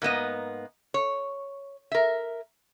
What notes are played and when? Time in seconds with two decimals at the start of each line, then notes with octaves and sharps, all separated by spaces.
0.02 G#2 A#3 B3 D#5
0.94 C#5
1.92 A#4 E5